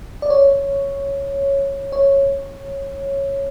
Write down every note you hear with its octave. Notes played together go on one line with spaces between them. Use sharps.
D5
C#5
C#5